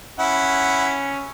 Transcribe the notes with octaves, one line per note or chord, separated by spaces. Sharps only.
C#4 E4 F#5